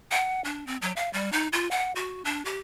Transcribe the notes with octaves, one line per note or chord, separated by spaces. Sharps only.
F#5
D4
C4
F#3
F5
G3
D#4
F4
F#5
F#4
D4
G4